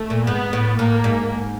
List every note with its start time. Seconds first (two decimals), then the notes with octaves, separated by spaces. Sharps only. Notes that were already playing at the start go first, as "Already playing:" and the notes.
Already playing: A3
0.10 A#2
0.26 G#2 B3
0.53 A2
0.78 A2 A#3
1.04 G#2